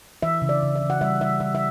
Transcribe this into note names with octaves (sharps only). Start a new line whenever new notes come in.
E3 E5
C#3
D5
C#3
E5
E3
F#5
G3 E5
G3 E5
G3 E5
E5